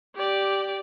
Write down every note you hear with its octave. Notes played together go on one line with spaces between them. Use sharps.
G4 D5